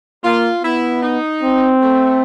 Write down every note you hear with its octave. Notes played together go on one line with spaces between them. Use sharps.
A#3 F4
B3 E4
D#4
C4
A3